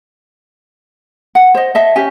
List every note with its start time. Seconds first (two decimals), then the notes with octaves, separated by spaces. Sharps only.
1.35 F#5
1.55 C5 D#5
1.75 D#5 E5 A5
1.96 C#4 G4 G#5